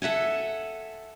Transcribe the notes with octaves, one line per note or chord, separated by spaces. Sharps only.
A4 E5 F#5 G#5